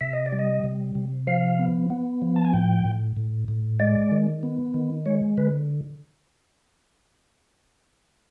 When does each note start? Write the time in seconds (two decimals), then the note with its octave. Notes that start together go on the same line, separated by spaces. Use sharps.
0.01 C3 E5
0.13 D#5
0.26 D5
0.32 G3
0.39 D#5
0.64 C3
0.95 C3
1.27 F3 F5
1.59 B3
1.90 B3
2.22 F3
2.36 A5
2.45 G#5
2.53 A2 G5
2.85 A2
3.17 A2
3.48 A2
3.80 G#3 D5
4.12 D#3
4.43 B3
4.74 D#3
5.06 G#3 C#5
5.37 D3 B4